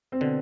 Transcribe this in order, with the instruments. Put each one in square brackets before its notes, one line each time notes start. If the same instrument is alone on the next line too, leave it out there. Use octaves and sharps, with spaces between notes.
[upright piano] C4
[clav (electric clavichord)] B2 D3